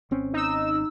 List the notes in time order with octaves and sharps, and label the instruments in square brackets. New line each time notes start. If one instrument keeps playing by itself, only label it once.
[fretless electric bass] G#1 C4 C#4
[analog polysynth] D#4 E6